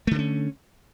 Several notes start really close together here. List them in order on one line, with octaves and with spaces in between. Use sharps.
A3 D3 A#3 C#4